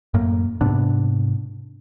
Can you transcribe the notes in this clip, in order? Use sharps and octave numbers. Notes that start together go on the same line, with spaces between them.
F#2 A2 A#3
G#2 C3 B3 D4